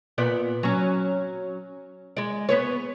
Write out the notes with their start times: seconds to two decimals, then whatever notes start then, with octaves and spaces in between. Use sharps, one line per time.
0.18 A#2 B3 D5
0.63 F#3 C#4
2.17 G#3 D5
2.49 B3 B4 C#5